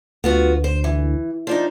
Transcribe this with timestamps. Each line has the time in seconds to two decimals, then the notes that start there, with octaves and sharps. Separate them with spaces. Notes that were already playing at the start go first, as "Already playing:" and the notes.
0.24 D2 B3 F4 F#4
0.64 C5
0.84 E3
1.47 F3 D4 D#4